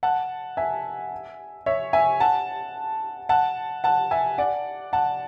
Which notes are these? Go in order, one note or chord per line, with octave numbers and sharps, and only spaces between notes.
F#5 A5
E5 G#5
C#5 E5
E5 G#5
F#5 A5
F#5 A5
F#5 A5
E5 G#5
D5 F#5
F#5 A5